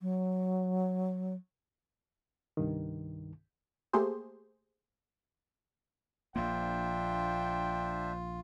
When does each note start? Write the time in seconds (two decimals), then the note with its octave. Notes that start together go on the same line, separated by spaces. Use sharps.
0.01 F#3
2.57 C2 G2 D#3
3.93 A3 A#3 G4 G#4 C5
6.36 A#1 A#3 D4 F4 C5 E5 G5